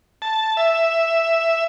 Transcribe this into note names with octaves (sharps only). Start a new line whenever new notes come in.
A5
E5